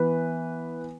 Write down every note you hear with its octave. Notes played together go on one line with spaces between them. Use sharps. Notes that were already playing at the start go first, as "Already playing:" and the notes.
Already playing: E3 B3 B4